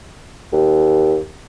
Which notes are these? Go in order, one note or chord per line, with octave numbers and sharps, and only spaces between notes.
D#2